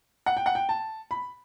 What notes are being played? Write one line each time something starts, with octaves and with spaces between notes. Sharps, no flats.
F#5
G5
F#5
G5
A5
B5